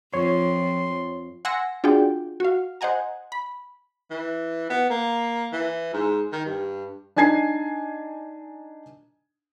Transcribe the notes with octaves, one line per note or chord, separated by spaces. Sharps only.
F2 F3 C#5 C6
F#5 G#5 C6 E6 A#6 C#7
D4 F4 F#4 G#4 D5 G5
F#4 F5
C5 D#5 F#5 G#5 A#5
B5
E3
B3
A#3
E3
G#2
D#3
G2
D4 D#4 G#5 G#6 C7